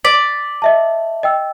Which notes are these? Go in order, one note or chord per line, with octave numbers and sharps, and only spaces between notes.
D5 B6
D#5 E5 A5
D#5 G5 E6